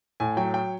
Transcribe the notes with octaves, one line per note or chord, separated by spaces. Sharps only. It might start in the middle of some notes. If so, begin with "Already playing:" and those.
A2 G#5
F#3 G5
G5